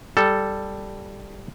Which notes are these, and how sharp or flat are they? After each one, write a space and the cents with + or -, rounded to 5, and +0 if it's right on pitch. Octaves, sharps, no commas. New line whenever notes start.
G3 +0 A4 +0